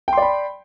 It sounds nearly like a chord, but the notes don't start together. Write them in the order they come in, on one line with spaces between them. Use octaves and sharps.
G5 C6 D5 B5